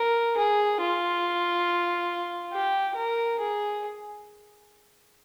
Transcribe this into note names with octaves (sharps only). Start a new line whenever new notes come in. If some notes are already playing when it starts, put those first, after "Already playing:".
Already playing: A#4
G#4
F4
G4
A#4
G#4